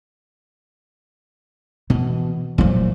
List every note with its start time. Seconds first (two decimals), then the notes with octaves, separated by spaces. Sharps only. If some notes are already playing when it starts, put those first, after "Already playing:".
1.90 B2 E3
2.58 A#2 F3 F#3 A3